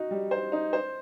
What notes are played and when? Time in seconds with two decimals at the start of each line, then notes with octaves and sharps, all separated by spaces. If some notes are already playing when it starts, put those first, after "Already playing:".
Already playing: D#4 F#4
0.11 G3
0.31 C5
0.52 D#4
0.73 C5